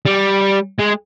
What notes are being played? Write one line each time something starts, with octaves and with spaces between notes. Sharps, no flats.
G3
G#3